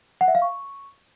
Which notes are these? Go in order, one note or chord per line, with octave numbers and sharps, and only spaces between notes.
F#5
E5
F5
C#6